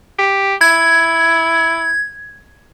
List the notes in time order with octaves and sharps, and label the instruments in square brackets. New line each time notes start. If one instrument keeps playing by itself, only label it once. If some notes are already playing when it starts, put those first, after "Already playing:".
[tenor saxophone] G4
[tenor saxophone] E4 [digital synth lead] G#6